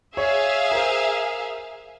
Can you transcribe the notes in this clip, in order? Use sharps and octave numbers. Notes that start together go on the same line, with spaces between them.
G#4 C#5 E5 F5
A#4 C5